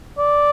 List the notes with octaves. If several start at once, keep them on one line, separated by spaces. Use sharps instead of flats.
D5